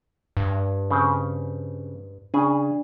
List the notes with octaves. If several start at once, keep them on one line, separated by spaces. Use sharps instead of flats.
G2
C#3 C4
C#3 D4 G#4 G#5